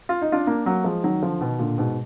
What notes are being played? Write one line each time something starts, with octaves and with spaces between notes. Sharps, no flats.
F4
D#4
D4 F4
A#3 D4
F#3 A#3
F3 G#3
D#3 F#3
D3 F3
B2 D#3
A#2 D3
G#2 B2